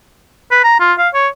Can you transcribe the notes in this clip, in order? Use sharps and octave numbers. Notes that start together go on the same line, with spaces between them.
B4
A#5
F4
F5
C#5